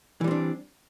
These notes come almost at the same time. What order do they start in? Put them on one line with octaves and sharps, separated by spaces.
E3 G3 C4 D4